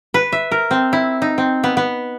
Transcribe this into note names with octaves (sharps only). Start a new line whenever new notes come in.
B4
E5
A#4
C4
E4
D#4
C4
B3
B3